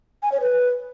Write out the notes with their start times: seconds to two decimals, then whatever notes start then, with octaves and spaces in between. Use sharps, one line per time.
0.23 G#5
0.32 C#5
0.41 B4